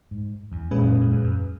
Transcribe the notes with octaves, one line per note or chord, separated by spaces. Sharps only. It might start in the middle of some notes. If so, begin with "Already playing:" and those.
G#2
E2
A#2 G#3 C#4 G#4 B4
F#2
G#2
F#2
E2
F#2